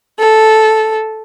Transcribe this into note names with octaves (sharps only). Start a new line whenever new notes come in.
A4